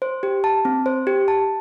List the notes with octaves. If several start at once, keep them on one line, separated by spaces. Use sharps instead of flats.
C5
G4
A5
C4
C5
G4
A5